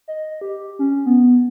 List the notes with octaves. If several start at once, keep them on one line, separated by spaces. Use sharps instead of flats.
D#5
G4
C#4
B3